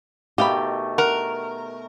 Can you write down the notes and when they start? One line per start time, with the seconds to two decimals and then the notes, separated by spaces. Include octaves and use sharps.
0.38 B2 D#3 A3 G4 D#5 F5 B5
0.98 A#4 F#5